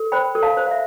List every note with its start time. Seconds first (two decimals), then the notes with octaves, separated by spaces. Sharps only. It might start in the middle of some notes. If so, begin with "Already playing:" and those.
Already playing: A4
0.12 C5 G5 B5
0.35 A4
0.43 F5 A5
0.57 C5
0.67 F5
0.71 E5